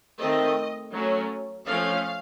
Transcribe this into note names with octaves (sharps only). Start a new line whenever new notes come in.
D#3 A3 C4 D#5
F#3 A3 C#4
F3 A3 C#4 F5